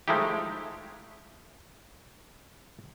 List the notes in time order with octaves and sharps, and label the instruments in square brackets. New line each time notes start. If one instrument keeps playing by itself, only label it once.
[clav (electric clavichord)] F3 G#3 A3 D#4 E4 G4